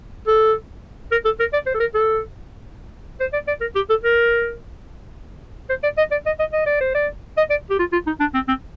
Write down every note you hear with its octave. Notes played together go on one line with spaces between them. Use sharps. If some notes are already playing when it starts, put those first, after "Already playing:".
A4
A#4
A4
A#4
D5
C5
A4
A#4
A4
C5
D5
D5
A#4
G4
A4
A#4
C5
D5
D#5
D5
D#5
D#5
D#5
D5
C5
D5
D#5
D5
G4
F4
F4
D#4
D4
C4
C4